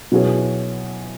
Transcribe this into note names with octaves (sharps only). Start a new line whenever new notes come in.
B2 F#3 C#4 E4 G#4